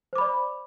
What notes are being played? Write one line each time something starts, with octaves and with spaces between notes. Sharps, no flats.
C5 D5 B5 D6